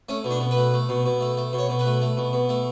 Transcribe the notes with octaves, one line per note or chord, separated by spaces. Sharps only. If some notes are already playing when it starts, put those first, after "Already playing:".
A3 C#4
B2
D4
B2
B4
A3
A3
B2
B2
A3
A3
B2
C#5
B2
B4
A3
A3
B2
B2
A3